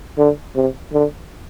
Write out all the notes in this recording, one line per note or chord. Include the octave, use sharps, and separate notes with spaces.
D3
C3
D3